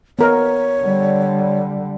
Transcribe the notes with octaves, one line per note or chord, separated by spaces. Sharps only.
B3 A#4 C#5 D#5
D3 G3